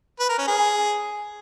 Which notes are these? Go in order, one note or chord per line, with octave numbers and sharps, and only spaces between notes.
B4
A#4
C#4
G#4